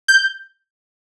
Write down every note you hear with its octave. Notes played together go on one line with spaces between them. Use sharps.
G6